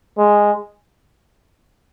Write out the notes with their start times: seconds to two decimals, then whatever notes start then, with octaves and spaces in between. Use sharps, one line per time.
0.18 G#3